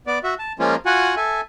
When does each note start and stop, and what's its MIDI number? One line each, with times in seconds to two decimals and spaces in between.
0.07 0.19 59
0.07 0.19 74
0.24 0.34 66
0.24 0.34 76
0.39 0.53 81
0.59 0.76 53
0.59 0.76 56
0.59 0.76 58
0.59 0.76 61
0.59 0.76 65
0.86 1.15 65
0.86 1.15 66
0.86 1.15 78
0.86 1.15 80
1.16 1.41 69
1.16 1.41 76
1.16 1.41 80